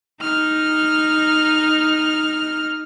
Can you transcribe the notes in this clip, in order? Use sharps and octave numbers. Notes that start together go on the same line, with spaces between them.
D#4 F6